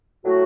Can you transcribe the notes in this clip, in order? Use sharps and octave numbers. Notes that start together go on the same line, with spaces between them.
A2 F#3 A3 F#4